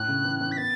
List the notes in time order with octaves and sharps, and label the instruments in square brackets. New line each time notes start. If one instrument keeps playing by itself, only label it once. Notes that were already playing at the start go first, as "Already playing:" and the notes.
Already playing: [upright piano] A2 [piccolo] F#6
[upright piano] C#3
E3
E3
[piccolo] B6
[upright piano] B3 [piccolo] A6